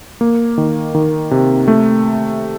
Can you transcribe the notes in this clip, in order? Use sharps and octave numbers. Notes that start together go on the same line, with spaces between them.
A#3
D#3
D#3
C3
A3